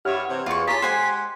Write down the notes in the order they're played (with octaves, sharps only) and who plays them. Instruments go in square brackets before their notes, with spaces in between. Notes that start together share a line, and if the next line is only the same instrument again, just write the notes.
[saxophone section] G2 E4 [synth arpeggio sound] G4 F#5 F6 [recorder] C#5
[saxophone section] C3 E3 C4
[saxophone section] E2 [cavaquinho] F4 C#6
[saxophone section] F4 G4 [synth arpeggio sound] G#4 C#5 A#5 [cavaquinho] A5 C6 [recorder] B6
[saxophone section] G#3 G4 F#5 [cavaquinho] C5 G#5 C6 [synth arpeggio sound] G#6